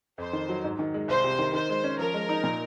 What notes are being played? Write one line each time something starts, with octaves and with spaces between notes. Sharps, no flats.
F2 C5
D#3
F#3
G#2
D#3
G#3
C2 C5
C3
D#3
D#3 C5
G#3
C#4
F3 A#4
G#3
D#4
A#2